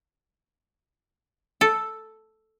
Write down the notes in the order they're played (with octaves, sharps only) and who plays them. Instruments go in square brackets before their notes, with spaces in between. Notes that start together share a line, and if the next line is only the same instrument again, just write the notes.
[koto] A4